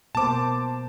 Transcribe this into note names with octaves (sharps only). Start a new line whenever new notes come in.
B2 A#3 C5 A5 D6